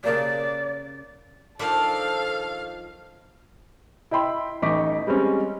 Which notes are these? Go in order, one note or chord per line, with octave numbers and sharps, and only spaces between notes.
C#3 A#3 G4 D5
D#3 F3 D4 A4 D5 F5
E4 D#5 G5 B5 C6
A1 A2 D#4 C#6 D6 B6
G3 G#3 C4 C#4